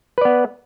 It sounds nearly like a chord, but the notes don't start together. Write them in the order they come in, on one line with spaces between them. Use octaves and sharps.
B4 D5 B3